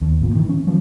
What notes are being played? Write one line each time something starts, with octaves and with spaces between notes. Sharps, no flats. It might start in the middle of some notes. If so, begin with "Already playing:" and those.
D#2
G#1 A#2
D#3 E3
C#4
D#3 F3 F#3